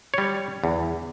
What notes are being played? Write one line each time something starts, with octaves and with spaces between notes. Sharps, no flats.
G3 C#5
E2